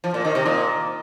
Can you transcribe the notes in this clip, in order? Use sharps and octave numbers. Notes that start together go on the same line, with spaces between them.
F3
A#2
D#3
C3
A#2